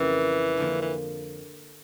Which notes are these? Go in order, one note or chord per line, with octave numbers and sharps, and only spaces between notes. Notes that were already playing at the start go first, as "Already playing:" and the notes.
Already playing: F2 C#3 E3 G3 A#3 C#4
D3 F3 A#3
E3